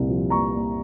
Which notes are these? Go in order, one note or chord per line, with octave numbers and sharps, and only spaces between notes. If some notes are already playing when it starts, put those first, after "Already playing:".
Already playing: C2 A#2 A#3
F3
A#2 A#5 C#6
A#3